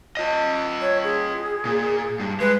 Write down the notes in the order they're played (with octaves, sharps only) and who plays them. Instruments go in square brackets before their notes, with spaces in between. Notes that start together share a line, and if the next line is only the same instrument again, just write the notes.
[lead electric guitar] F4 D#5
[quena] C#5
G#4
[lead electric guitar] A#2
G2
[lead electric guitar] G#3 [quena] B4